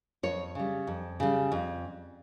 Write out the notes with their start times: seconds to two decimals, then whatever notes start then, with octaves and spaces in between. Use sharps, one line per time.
0.23 F2 C#5
0.55 C#3 G3
0.87 F2
1.20 C#3 G3
1.52 F2